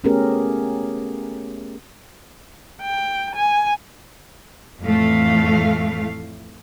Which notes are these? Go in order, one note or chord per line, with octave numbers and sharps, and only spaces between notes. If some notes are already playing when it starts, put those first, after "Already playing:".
A3 B3 C#4 G4 G#4 A#4
G5
G#5
F2 A2 E3 A3 F5